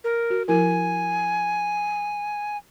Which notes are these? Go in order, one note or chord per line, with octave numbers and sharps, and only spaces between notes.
A#4
F#4
F3 E4 A#4 G#5